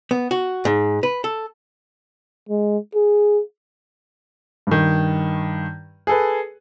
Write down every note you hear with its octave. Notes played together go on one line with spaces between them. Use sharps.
B3
F#4
G#2
B4
A4
G#3
G#4
G2 D#3
G#4 A4 B4